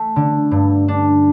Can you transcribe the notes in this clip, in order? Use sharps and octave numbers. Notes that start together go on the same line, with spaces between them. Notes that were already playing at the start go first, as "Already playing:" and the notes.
Already playing: A3
D3
G2
D4